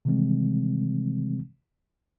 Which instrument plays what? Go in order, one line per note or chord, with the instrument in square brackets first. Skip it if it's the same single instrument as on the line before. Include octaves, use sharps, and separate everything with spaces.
[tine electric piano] C3 D#3 E3 G3 G#3 C4